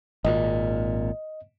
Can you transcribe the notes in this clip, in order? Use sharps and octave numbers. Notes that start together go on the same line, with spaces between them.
G#1 A#2 D#5